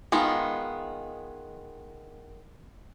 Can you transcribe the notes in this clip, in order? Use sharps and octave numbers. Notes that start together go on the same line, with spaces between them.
D#3 G#3 B3 F4